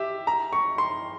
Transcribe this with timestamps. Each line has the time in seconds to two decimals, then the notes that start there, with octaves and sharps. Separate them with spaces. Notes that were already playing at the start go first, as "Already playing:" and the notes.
Already playing: G4 E5
0.27 A#5
0.53 C#6
0.78 C6